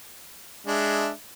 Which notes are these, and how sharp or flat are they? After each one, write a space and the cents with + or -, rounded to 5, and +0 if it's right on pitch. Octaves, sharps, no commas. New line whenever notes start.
G#3 +0 D4 +0 E5 +0